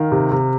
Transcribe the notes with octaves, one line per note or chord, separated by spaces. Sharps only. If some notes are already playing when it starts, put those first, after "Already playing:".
Already playing: D#3 F5
C3
C3